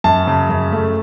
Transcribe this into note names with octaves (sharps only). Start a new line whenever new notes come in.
F#2 A5
C#3
F#2
A3